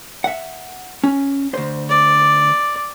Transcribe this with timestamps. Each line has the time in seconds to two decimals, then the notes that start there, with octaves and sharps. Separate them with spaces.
0.24 E5 F#5
1.04 C#4
1.54 D2 C5
1.89 D5